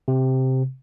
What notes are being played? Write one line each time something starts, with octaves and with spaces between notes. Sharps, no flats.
C3